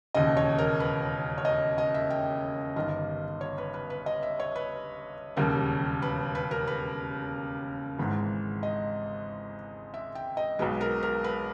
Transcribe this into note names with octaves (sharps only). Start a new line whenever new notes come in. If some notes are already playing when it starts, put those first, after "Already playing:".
E1 D#2 C#3 D#5
C#5
A#4
B4
C#5
D#5
D#5
E5
G5
G1 G2 D#3 D#5
C#5
B4
B4
B4
D#5
E5
C#5
B4
E1 D#2 C#3 G3 A#4
B4
B4
A#4
B4
G#1 G#2 E3
D#5
E5
G5
D#5
B1 B2 G#3 B4
A#4
A#4
B4